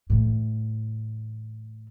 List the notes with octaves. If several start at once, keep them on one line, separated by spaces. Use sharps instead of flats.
A2 E3